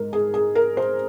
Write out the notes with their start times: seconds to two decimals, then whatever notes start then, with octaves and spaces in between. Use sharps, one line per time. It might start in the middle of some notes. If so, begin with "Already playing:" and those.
Already playing: G#2 A#4
0.13 G#4
0.34 G#4
0.55 A#4
0.77 C5